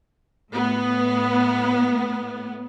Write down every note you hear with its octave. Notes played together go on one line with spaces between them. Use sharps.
A2 B3